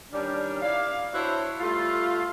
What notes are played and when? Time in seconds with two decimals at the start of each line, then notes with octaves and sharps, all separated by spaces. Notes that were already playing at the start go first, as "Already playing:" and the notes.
0.12 D#3 G3 C#4 D4
0.62 E4 D5 F5
1.13 D4 E4 F#4 C5 C#5
1.60 G3 A3 F4